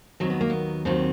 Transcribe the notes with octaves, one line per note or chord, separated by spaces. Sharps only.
D#2 D#3 F#3 C4
B3
A#3
B3
D#2 D#3 F#3 C4